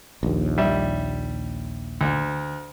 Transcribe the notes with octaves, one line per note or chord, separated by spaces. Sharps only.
A#1 D#2
G3 E5
D2